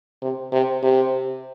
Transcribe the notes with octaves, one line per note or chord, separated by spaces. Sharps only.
C3
C3
C3